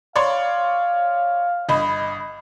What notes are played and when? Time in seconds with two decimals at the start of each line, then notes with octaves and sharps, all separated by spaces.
0.16 C#5 D5 F5 C6
1.69 G1 D#5 B5